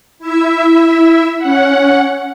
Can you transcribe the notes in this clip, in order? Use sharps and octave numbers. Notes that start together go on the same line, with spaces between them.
E4 E5
C#4 F#5